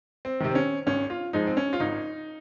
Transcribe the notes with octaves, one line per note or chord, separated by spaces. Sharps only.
C4
C3 D#3
C4
C#4
G#1 C#4
F4
G#2 F3 G#3 D#4
C4
C#4
F4
G#1 D#4